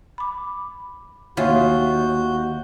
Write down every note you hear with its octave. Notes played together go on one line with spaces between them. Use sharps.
B5 D6
D#2 F4 F#4 C#5 E5 G#5 G6